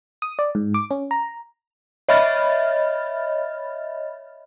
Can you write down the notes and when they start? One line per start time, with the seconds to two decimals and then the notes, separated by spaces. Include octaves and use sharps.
0.22 D#6
0.39 D5
0.55 G#2
0.74 D6
0.91 C#4
1.11 A#5
2.09 C#5 D#5 E5 B5 F6 A6